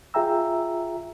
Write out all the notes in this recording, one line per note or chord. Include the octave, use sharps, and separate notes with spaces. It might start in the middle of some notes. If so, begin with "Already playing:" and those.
F4 G#4 E5 G5 A#5 E6